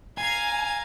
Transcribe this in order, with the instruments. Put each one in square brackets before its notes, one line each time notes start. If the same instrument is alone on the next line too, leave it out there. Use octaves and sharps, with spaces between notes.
[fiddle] F5 A#5 [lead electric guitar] G#5 [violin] G#6